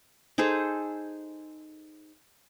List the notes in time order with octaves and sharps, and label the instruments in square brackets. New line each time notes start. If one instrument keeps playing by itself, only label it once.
[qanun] D#4 G#4 A4 C5